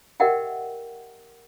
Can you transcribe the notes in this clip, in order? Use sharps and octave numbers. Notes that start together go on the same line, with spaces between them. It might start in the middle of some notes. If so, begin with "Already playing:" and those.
G4 A#4 D#5 E5 F#5 G5